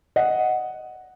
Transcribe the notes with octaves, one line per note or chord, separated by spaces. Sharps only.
D#5 F#5